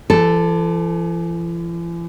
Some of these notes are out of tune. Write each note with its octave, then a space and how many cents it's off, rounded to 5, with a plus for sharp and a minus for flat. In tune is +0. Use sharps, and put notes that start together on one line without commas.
E3 +45 A4 +0